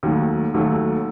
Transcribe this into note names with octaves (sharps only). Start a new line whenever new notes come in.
D#2 D#3 F#3 A3
D#2 D#3 F#3 A3